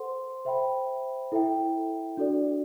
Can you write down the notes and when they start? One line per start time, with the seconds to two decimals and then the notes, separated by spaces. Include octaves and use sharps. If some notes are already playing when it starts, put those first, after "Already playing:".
Already playing: A4 C5 F#5 C6
0.45 C5 E5 G5 B5
1.32 E4 A4 E5 G5
2.17 D4 F#4 A4 D5